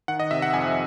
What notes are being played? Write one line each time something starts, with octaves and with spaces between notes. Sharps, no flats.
D#3 F#5
D#5
C3 E5
F#5
F2 G#5